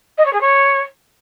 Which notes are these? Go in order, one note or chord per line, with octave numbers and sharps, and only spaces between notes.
D#5
C#5
G#4
C#5